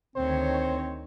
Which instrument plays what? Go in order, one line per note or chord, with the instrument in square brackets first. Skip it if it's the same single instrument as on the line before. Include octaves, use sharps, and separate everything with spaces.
[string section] D2 D#3 C#5 [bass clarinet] C4 [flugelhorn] C5